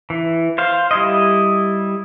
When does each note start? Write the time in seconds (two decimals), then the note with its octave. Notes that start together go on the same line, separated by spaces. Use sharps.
0.10 E3
0.58 C5 F5
0.91 G3 E4 D#5